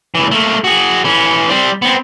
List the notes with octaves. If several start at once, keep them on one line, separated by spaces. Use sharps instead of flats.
C#2 E3
A3 A#3
F#4 G#4
E3 C#4
G3 C4
B3 C4